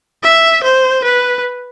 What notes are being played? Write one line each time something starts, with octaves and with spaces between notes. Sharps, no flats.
E5
C5
B4